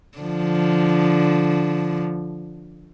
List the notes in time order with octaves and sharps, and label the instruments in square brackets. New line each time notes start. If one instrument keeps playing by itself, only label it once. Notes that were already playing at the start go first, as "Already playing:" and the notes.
[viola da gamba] D3 F3